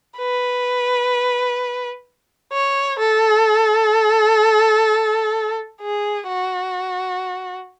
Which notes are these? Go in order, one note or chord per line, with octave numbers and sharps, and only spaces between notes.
B4
C#5
A4
G#4
F#4